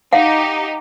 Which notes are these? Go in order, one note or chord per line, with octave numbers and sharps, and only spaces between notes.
D#4 G4 F5 F#5